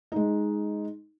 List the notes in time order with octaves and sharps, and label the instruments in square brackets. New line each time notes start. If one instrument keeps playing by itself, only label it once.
[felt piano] G#3 D#4